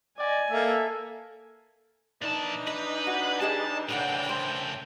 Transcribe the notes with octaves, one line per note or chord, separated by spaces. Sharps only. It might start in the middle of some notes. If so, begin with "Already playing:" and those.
D5 D#5 G#5
A#3 A4 E5
A#2 E3 D4 D#4 A5
B4 D#5
F#4
G4 G#4 D#5 A5
A2 C#3 A4 A#4 F#5 G5
A#4 C5